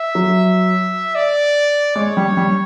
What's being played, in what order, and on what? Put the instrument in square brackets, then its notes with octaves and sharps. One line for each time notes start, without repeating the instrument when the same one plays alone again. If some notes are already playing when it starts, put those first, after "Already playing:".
Already playing: [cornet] E5
[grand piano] F#3
[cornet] D5
[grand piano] G#3 [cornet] C#5
[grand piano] G3
G3